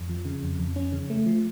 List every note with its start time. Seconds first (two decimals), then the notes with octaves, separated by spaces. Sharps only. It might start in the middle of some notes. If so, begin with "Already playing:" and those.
Already playing: F2
0.09 F3
0.25 C#3
0.43 F2
0.59 F2
0.76 C#4
0.92 C#3
1.10 A3
1.26 F3